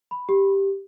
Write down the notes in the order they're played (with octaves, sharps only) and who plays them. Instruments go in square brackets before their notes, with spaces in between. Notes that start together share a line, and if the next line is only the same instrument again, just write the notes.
[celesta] B5
G4